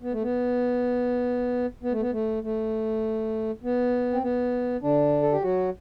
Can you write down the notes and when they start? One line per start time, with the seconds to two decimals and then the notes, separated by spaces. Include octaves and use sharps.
0.02 B3
0.13 A3
0.22 B3
1.83 B3
1.92 A3
2.01 B3
2.12 A3
2.43 A3
3.63 B3
4.13 C4
4.23 B3
4.82 D3 D4
5.22 A4
5.32 G4
5.43 F#3 F#4